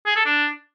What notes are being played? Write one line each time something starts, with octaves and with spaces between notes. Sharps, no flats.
G#4
A4
D4